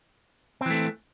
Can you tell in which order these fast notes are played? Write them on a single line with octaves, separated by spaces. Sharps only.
C4 E3 A3